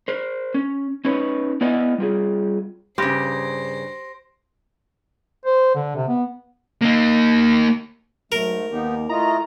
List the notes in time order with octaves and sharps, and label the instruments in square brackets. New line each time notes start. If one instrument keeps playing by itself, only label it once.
[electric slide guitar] A#4 C5
C#4
C#4 D#4 B4 C#5
B3 E4 D5 D#5 F#5 G#5
G3 F4 G#4
[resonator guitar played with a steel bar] G2 C#3 [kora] G4 [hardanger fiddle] C5 [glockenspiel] C6 A#6 D7
[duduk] C5
D3
C3
B3
[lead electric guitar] A#3 D#4
[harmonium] G#2 A3 [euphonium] F#3 [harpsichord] A#4
[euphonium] D#2 [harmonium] B3 D#4 G4
[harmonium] A3 F4 D#5 [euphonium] E4 [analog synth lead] A#5